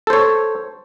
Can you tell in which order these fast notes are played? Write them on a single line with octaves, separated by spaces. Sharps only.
A4 C5 C#5